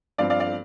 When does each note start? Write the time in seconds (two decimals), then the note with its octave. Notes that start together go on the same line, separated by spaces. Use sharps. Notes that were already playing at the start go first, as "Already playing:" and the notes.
0.18 G2 F3 C4 D5 F5
0.30 D5 F5
0.40 D5 F5